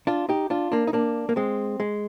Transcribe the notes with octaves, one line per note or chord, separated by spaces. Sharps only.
D4 F4
D#4 G4
D4 F4
A#3 D4
D#4
A#3 D4
A#3
G#3 C4
G#3